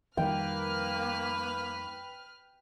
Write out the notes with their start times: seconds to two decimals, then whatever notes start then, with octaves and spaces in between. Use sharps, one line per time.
0.17 F2 D#3 G3 A#3 B4 G5 F6